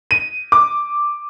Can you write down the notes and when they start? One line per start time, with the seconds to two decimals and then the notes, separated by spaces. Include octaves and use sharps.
0.11 D#7
0.52 D6